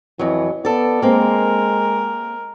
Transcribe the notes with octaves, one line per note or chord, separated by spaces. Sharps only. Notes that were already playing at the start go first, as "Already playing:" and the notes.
F2 E3 F#3
B3 A4 D5
G#3 A#3 C4 A#4